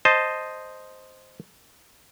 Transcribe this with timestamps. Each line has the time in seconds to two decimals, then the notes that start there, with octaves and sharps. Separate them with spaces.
0.05 C5 D#5 A5